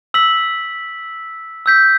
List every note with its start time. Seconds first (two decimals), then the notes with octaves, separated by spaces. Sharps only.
0.14 E6 B6 F#7
1.66 E6 G6 B6